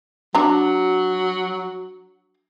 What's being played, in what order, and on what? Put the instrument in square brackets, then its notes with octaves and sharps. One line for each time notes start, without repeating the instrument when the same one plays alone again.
[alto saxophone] F#3 [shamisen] D4 F#4 A#5